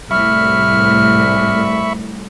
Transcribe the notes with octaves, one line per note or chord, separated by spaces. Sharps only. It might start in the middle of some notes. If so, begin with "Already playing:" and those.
C2 A2 E5 B5 C#6 F6